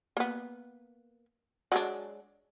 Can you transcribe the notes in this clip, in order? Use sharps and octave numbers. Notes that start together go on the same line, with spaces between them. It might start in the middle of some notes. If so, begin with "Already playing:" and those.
A#3 B3
F#3 G#3 D4